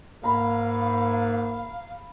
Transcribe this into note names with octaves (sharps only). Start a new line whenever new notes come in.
G#2 A#3 F5 A#5 B5